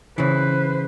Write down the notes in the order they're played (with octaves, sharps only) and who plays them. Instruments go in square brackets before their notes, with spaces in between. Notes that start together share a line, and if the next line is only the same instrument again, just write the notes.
[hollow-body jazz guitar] C#3 E3 [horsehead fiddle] B4 C5